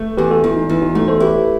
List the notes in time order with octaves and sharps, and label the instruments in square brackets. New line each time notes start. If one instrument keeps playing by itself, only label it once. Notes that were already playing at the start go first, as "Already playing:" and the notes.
Already playing: [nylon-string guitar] A3
[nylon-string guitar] E2 [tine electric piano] G4 B4
[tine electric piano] F#4 A4
[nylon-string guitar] E2 [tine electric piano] E4
[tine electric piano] D#4
[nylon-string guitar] E2 [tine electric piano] E4
[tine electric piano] D#4 F#4
[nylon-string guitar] A3 [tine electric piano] D#4 F#4
[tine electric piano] A4 C5
[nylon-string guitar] E4 [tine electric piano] G4 B4